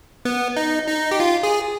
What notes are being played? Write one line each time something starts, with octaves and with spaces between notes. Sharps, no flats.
B3
D#4
D#4
G4
F4
G#4